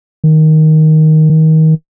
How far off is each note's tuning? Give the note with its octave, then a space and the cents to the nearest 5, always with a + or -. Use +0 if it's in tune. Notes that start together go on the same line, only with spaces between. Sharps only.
D#3 +5
D#3 +25